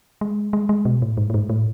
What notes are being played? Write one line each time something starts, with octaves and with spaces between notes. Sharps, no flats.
G#3
G#3
G#3
B2
A2
G#2
A2
G#2
A2